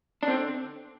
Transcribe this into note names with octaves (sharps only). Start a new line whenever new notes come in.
D4
D3 C4